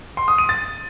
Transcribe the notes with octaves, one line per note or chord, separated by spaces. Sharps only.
C6
D#6
D#7
A6